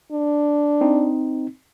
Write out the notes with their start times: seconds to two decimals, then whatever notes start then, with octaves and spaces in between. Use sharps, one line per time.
0.12 D4
0.81 C4 D#4